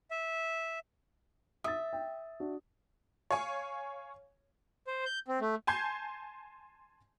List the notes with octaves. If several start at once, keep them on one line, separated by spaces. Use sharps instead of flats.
E5
E5 D#6 A6
G5
D4 F#4
C#5 F5 G#5 C#6
C5
G6
C4
A3
G#5 A5 C6 G6 G#6 C7